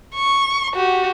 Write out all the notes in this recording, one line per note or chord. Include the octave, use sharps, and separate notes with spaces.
C#6
F#4 G4